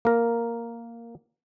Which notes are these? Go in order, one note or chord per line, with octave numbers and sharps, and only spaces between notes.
A#3 A#4